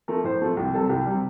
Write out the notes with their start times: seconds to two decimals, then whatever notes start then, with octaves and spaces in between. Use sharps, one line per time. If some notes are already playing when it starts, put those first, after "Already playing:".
0.08 F3 A3 A#4
0.24 A2 C5
0.41 F3 A3
0.57 C2 G4
0.74 C3 G3 A4
0.89 C2 G4
1.06 C3 G3